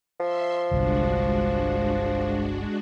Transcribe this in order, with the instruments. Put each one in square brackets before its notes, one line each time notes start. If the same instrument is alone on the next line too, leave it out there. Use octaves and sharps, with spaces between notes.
[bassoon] F3 [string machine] E5 C6
[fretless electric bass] G1 C2 G2 [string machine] G#3 D4 F#4